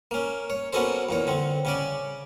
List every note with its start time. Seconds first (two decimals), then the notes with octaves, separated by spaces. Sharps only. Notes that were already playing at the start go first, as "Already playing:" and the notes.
0.11 A#3 C#4
0.50 C#5
0.73 A#3 B3 C#4 F#4 A4 C5
1.09 E2 A#2 C#5
1.27 D3 C4
1.65 C#3 C#4 D5